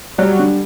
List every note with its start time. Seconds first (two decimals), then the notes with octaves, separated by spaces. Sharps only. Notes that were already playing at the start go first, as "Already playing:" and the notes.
0.18 F#3 G3
0.39 D3